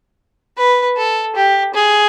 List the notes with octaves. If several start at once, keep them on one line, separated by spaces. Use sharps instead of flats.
B4
A4
G4
G#4